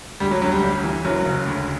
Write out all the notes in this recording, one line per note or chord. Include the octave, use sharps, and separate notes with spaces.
D2 G3
F#3
D2 F#3
G3
G1
E3
F#1 F#3
C#3
D2